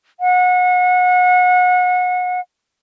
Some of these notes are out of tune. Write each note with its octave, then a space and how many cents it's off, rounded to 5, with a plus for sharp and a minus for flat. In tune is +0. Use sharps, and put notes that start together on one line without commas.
F#5 -30